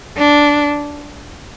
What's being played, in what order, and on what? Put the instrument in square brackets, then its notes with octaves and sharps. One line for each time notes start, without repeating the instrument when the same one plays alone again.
[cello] D4